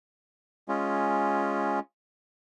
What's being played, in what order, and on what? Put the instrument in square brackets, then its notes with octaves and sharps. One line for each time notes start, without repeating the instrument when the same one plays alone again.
[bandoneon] G#3 C#4 F4